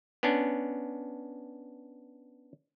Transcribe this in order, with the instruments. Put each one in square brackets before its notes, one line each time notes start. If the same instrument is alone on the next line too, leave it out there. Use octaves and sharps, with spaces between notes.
[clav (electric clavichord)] B3 C#4 D4